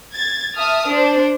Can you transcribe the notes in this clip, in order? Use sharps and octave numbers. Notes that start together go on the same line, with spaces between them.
G#6 A6
E5 A5 D#6 F6
D4 C5